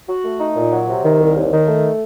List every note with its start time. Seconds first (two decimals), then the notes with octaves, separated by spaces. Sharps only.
0.09 F#4
0.24 A3
0.40 D#4
0.56 A#2
0.72 F#3
0.88 C3
1.04 D#3
1.20 C2
1.36 D#2
1.52 D#3
1.68 A3